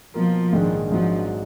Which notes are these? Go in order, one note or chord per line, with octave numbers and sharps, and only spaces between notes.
B2 F3 A#3 F4 A#4
A#1 G#2 D#3 G#3 D4
G#1 G#2 F3 F#3 D4